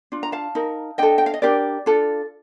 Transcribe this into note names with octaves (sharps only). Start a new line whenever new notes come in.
D4 F4
A#5
F5 A5
D#4 A#4
D4 A4 D#5 G5
G5
F5
D#5
D4 G4 A#4 D5
D4 F4 A4